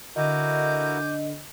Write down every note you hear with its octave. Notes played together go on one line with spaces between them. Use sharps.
D3 E4 F#4 A#4 D#5 G#5 D6 G6